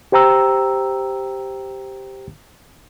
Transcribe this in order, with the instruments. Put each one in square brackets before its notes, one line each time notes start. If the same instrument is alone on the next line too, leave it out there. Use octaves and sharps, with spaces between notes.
[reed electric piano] G4 C5 G5 A#5 E6